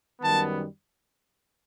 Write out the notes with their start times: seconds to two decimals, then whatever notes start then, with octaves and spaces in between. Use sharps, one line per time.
0.21 F#2 D#3 G3 B3 A5